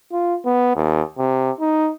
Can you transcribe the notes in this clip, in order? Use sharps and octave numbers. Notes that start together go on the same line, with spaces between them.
F4
B3
D#2
C3
D#4